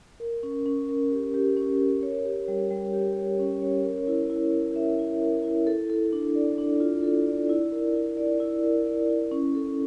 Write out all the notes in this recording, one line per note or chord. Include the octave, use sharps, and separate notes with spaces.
A#4
C#4
C#4
A#4
G4
G4
C#4
A#4
C#5
G4
G3
G3
G4
C#5
C#4
C#5
A#4
E4
E4
A#4
E5
E4
A#4
E4
A4
A4
D4
D5
D4
F4
A4
D5
E4
A#4
E4
D5
E4
A#4
D5
E4
C#4
A4